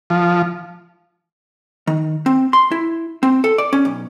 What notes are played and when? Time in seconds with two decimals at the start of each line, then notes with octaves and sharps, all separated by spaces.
0.10 F3
1.87 D#3
2.26 C4
2.53 C6
2.72 E4
3.23 C4
3.44 A4
3.58 D5
3.73 C#4
3.85 B1